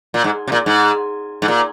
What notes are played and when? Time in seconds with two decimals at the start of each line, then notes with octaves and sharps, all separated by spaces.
0.14 A#2
0.24 G#2
0.47 C3
0.52 A#2
0.66 G#2
1.42 G#2
1.48 A#2